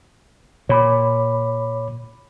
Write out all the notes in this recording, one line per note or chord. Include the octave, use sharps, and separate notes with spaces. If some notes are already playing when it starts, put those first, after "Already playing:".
A#2 C#5 B5 D6